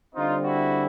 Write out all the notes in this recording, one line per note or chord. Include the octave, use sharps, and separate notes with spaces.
D3 G3 C4 D#4 F4
E4 F#4